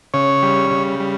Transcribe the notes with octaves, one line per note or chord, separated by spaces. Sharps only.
C#3 C#5
G3
C#3
G3